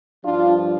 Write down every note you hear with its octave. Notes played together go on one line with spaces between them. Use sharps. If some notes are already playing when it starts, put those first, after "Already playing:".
G2 F3 D4 F4